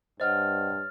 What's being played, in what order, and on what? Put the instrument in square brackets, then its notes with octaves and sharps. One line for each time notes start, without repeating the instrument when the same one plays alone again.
[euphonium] G2 [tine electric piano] C5 D#5 F#5 [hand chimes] C#5 F6 A6